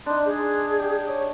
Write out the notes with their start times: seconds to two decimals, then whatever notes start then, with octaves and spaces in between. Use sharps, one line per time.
0.06 D4 D#4 C6
0.25 G#4
0.79 G4
1.08 C#5